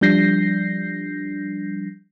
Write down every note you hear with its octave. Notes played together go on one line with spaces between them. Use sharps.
F3 G3 D4 G6 A#6 C7